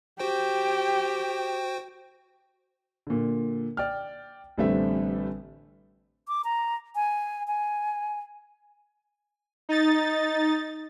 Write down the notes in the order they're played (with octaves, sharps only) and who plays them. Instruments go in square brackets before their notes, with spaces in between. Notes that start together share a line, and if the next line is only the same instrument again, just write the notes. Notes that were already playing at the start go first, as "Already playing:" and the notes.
[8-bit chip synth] F#4 C5 G5 [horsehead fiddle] G4
[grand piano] A#2 D3
D5 G5 F6
A1 D3 G3 A3 C4 E5
[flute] D6
A#5
G#5
G#5
[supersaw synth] D#4 A6